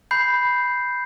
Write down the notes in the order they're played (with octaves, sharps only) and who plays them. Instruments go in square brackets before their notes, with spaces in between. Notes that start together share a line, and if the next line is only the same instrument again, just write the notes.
[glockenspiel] B5 G6 C7